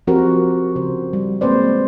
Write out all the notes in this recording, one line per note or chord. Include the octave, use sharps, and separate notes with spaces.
F3 C4 F#4 G4 A#4 C5
C#3 C5
G3
G#3 A#3 C4 B4 C5 D5